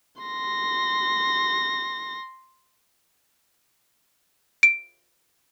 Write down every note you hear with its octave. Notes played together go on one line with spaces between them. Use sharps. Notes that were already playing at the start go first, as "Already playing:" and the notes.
C6 A#6
D7